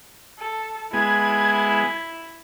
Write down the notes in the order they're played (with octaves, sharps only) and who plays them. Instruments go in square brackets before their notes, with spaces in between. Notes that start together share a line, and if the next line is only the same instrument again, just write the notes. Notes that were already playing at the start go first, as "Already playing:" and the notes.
[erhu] A4
[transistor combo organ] G#3 B3 [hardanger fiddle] E4 [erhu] G#6